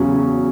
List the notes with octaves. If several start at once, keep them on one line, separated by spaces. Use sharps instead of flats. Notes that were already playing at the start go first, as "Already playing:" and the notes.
Already playing: E2 C#3 F#3 C#4 G#4